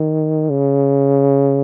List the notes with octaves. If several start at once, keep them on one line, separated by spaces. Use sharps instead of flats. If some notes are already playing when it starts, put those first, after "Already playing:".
Already playing: D#3
C#3